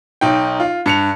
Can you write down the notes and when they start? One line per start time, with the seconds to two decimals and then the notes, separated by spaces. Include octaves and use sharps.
0.21 B1 D#4 G5
0.60 F4
0.86 G2 C#7 F7